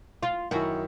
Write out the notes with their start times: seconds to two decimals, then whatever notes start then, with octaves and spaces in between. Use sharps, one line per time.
0.23 F4
0.51 F#2 D#3 E4 F#4